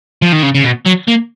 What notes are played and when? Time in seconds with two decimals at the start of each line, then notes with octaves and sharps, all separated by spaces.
0.22 F3
0.32 D#3
0.43 C#3
0.55 C#3
0.64 B2
0.86 F#3
1.08 A#3